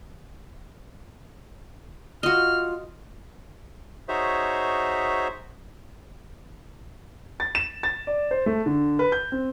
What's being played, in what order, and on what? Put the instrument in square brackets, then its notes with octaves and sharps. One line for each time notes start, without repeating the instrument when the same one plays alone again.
[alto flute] F4 [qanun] F#4 D#5 [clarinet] F6
[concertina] D#4 F#4 G#4 C5 C#5 E5
[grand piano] A6
E7
A6
D5
C5
A3
D3
B4
G6
C4